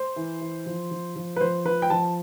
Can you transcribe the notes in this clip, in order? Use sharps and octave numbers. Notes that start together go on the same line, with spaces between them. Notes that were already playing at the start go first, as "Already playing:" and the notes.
Already playing: C5
E3
E3
F3
F3
F3
B4
F3 C5
F3 B4
G5
F3 A5